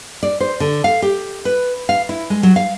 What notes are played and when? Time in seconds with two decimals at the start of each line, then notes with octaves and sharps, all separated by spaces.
0.23 D5
0.41 C5
0.60 D3
0.84 F5
1.02 G4
1.45 B4
1.89 F5
2.09 E4
2.30 G#3
2.43 F#3
2.56 F5